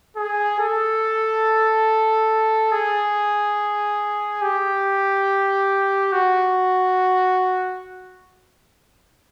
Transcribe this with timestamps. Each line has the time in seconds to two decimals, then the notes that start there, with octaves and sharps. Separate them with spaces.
0.17 G#4
0.59 A4
2.72 G#4
4.42 G4
6.12 F#4